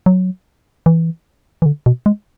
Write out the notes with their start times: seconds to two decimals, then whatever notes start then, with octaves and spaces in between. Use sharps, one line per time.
0.06 F#3
0.86 E3
1.62 E3
1.66 D3
1.86 B2
2.06 G#3